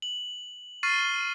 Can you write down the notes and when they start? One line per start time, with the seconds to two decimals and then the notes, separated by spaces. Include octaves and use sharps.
0.02 F#7
0.83 C#6 F6 A6 C7 D#7